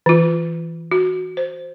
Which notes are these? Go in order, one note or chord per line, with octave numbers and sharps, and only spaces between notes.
E3 F4
F#4
C5